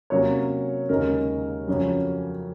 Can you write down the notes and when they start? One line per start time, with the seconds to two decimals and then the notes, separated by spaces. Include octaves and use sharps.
0.10 C3 F#3 A#3 C#4 C#5
0.89 D#2 C#3 G#3 D#4 A#4
1.68 F2 C#3 F#3 C#4